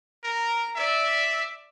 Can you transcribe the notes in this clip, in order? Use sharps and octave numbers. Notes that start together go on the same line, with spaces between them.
A#4 A#5
D5 E5